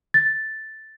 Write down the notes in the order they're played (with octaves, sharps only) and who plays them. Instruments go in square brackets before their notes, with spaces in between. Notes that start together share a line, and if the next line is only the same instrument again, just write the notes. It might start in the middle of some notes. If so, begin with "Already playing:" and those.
[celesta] A6